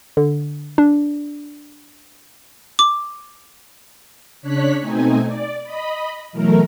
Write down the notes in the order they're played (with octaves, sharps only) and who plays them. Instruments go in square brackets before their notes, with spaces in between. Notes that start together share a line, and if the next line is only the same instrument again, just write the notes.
[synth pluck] D3
D4
[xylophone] D6
[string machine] C#3 D4 C#5 F#6 B6
B2 A3 C4 D#4 G#5
D5
D#5 B5
B2 E3 F#3 A3 A#4